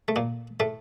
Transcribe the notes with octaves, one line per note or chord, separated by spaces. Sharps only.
A3
A#2 A#3
A2 A3